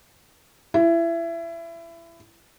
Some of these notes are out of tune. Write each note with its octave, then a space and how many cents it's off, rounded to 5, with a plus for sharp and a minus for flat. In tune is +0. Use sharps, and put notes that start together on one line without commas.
E4 +25